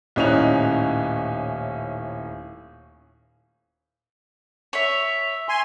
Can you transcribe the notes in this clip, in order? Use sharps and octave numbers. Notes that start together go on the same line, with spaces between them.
D#1 A2 C#4 D#4 F#6 F7
C#5 E5
G#5 C6